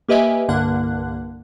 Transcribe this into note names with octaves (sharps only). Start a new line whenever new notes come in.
A#3 G4 B4 D#5 E5 G#5
C2 G2 D3 A#3 F#5 F#6